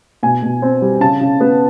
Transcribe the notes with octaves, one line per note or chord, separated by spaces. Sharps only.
B2 G#5
B2
C4
G3
C#3 A5
C#3
B3